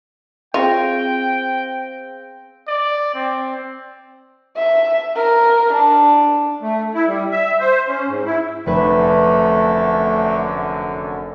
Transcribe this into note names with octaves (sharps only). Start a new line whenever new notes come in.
C4 F4 G#4 F5 G5 A#6
D5
C4
E5
A#4
D4
A3
E4
G3
E5
C5
C#4
G#2
E4
F1 F#2 D3 A3 B4 E5